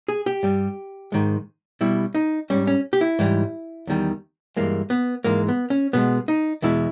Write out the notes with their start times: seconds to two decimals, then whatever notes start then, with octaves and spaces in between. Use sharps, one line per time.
0.08 G#4
0.26 G4
0.43 G2 G3
1.12 G#2 D#3 G#3
1.81 B2 G3 E4
2.15 D#4
2.50 G#2 G3 C#4
2.67 C#4
2.93 G4
3.01 E4
3.19 G#2 E3 G3
3.87 E2 D#3 G3
4.56 G2 E3 G#3 A#3
4.90 B3
5.24 G#2 E3 G#3 A#3
5.49 B3
5.70 C#4
5.93 B2 G#3 B3
6.28 D#4
6.62 E2 B2 G#3 E4